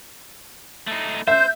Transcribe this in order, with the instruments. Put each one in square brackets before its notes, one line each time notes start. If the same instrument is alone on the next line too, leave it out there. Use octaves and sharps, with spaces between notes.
[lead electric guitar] A3 D#4
[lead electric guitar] C5 [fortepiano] E5 [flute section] G6